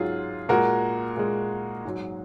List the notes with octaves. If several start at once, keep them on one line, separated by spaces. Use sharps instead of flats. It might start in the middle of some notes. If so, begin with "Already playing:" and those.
Already playing: G#2 F#3 F4 G#4
A#2 G#3 F#4 A#4
A#2 G#3
G#2 F#3